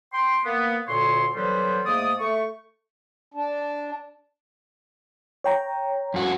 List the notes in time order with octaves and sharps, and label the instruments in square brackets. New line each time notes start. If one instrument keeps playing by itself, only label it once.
[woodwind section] G5 C6
A#3 B3
D2 A#2 D3 C#5 C6
D3 E3 F#3 G3 B3 C5
G#2 A3 A#3 D5 D#6
A3 C#6
[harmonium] D4
[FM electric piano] C#5 G5 A#5
[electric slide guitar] F2 F#4